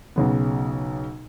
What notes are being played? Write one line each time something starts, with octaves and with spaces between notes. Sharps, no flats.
B1 C#3 B3